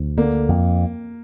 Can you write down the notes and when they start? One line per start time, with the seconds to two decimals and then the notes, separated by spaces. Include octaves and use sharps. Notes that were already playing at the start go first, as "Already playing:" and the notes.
Already playing: D2
0.18 D3 A#3
0.49 F2